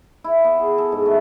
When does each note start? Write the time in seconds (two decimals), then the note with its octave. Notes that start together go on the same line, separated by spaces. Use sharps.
0.24 E4
0.44 B3
0.59 G#4
0.78 A4
0.92 G#2
1.06 A3